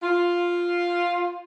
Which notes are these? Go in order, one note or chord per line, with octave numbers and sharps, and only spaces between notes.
F4